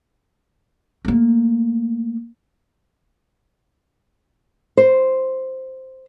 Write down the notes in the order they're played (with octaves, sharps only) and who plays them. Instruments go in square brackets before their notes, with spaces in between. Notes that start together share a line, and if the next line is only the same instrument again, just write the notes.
[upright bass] A3 A#3
[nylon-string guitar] C5